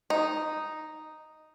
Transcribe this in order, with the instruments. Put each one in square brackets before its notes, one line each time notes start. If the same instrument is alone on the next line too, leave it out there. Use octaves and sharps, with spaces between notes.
[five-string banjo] D#4